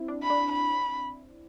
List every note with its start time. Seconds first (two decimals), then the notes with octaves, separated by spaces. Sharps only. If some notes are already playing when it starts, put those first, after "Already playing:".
Already playing: C4 E4
0.08 D4
0.23 B5
0.30 D4
0.52 B5